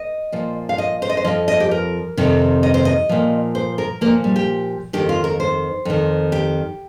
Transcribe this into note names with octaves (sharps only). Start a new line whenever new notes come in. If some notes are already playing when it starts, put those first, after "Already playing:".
Already playing: D#5
A#2 F3
F5
D#5
C5
D#5
C5
F2 F3 D#5
D#5
G4
A#4
F2 C3 D#3
D#5
C5
D#5
A#2 F3
C5
A#4
A#2 F3 A#3
G3
G4
F2 D#3 G4
F4
A#4
C5
F2 D#3
G4